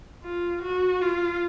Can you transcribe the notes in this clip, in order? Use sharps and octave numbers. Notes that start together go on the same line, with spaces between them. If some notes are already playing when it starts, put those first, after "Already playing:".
F4
F#4
F4